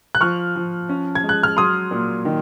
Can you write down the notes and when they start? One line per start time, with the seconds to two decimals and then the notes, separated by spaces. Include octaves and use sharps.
0.15 F#6
0.21 F3 C#6 F6
0.56 F3
0.89 C#4
1.15 G#6
1.24 G#3
1.29 F#6
1.43 F6
1.57 F#3 C6 D#6
1.91 A#2
2.25 D#3